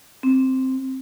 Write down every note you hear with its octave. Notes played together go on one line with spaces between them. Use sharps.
C4